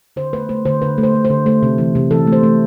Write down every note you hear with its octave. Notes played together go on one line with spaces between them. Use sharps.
D3 C5
A3 B4
A3 C5
D3 C5
D3 B4
A3
C5
A3
C5
D3
A3 C5
C3
E3
C3
E3 A4
A3
C5
A3